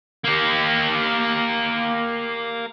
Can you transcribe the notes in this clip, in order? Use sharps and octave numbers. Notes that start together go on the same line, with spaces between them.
A#3 G4